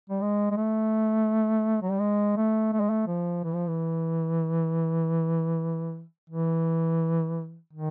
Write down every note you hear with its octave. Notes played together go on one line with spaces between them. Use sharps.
G3
G#3
G#3
A3
F#3
G3
G#3
A3
A3
G#3
A3
F3
E3
F3
E3
E3
D#3